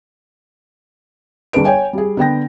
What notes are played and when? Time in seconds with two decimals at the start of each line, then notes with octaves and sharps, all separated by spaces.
1.53 G1 D4 G#4 B4 D7
1.65 C#5 G5 G#5
1.93 G3 G#4
2.17 D3 B3 G5 A#6